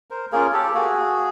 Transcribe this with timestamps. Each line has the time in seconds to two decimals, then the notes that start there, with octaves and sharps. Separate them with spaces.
0.10 A#4 C5
0.32 A#3 C#4 F4 G#4 A#4
0.53 G4 A4
0.74 A#3 F#4 G#4